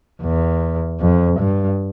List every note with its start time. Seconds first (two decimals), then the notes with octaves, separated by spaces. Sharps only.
0.22 E2
1.01 F2
1.40 G2